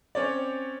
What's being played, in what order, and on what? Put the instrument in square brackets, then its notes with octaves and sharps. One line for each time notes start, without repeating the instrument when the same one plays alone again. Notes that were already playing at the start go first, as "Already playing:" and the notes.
[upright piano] C4 C#4 C#5 D5